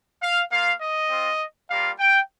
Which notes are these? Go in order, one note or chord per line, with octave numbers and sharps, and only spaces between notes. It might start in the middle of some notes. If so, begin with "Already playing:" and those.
F5
A#3 F4 F5
D#5
C4 F4
G3 A#3 F4 F5
G5